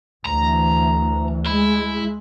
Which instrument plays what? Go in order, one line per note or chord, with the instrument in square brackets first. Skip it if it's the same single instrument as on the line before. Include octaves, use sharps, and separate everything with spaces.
[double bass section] D2 E3 [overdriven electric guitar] A#5
[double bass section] G#3 [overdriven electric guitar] E4